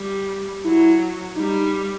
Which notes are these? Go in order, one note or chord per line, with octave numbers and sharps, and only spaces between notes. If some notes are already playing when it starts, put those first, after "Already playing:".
Already playing: G3
F#3 E4
G3 D#4